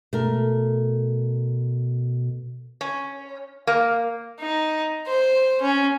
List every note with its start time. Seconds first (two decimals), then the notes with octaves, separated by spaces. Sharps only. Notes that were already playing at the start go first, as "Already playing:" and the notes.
0.13 B2 A3 A#4
2.81 C#4
3.67 A#3
4.40 D#4
5.06 C5
5.62 C#4